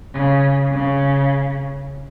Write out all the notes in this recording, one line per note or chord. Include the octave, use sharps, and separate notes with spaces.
C#3
C#3